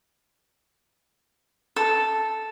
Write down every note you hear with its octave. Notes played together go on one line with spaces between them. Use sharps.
A4